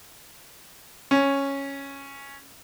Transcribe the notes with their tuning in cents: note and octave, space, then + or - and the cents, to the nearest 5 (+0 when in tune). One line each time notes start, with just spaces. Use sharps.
C#4 -5